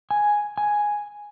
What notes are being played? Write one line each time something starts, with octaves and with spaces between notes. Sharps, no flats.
G#5
G#5